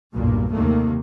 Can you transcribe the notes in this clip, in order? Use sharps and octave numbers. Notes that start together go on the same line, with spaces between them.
B1 E2 G2 A#2 A#3
D#2 G#2 C3 D#3 A3 A#3